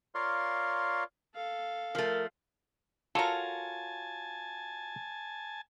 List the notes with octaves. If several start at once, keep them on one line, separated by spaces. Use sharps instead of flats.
F4 A#4 C#5 D5 F5 C6
A4 F5
F3 A3 A#4
F4 F#4 A4 A#4 C#5 G#5 A5